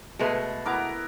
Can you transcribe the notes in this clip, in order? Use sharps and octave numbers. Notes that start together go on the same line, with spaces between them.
B2 G#3 A3 G#4 B4
B3 E4 A#4 A#5 D6